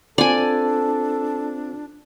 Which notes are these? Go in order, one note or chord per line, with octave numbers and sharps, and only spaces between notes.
C4 D4 F4 A4 C5 D5 G#5